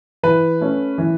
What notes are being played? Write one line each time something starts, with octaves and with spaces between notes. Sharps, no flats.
E3 B4
A3 C#4
E3